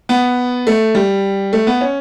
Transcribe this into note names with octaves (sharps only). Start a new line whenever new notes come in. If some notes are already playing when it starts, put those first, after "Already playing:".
B3
A3
G3
A3
B3
C#4